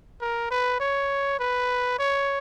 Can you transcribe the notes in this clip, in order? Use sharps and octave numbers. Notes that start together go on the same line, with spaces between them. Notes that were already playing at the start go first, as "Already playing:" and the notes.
A#4
B4
C#5
B4
C#5